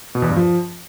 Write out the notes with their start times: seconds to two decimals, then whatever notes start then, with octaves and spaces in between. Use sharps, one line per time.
0.15 B2
0.22 E2
0.29 G2
0.36 F3